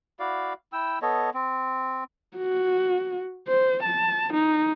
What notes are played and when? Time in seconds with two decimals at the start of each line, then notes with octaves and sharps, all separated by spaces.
0.19 E4 F#4 D5 F5
0.73 E4 G5 E6
1.02 B3 A4 C#5 D#5
1.34 C4
2.37 F#4
3.48 C5
3.83 A5
4.34 D#4